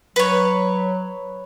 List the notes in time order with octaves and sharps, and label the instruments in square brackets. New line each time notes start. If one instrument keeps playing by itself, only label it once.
[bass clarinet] F#3 [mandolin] B4 C#5